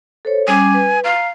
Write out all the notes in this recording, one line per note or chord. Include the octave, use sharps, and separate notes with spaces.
A4 C5 C#5
G3 C#4 G#5 D6
B4
F5 A#5